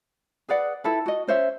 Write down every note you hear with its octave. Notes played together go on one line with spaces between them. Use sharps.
G#4 B4 D5 F#5
E4 A4 B4
F#4 D#5
C#4 C5 C#5 E5